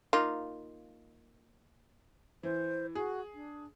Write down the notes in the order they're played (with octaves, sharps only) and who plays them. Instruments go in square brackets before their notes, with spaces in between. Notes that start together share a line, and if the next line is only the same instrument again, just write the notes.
[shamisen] A#3 D#4 F4
[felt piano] E3 [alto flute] C5
[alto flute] F#4 [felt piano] G#4
[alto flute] D4